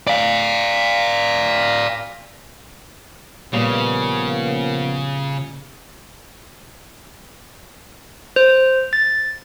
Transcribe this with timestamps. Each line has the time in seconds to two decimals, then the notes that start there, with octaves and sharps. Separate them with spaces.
0.07 D5 F5
3.53 A#2 C#3 F3 G3 A#3 B3
8.36 C5
8.93 A6